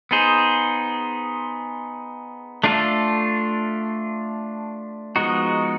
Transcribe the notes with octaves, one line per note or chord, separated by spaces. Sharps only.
B3 D#4 G#4 C5
A3 D4 F4 A4
F3 G#3 B3 D#4 F#4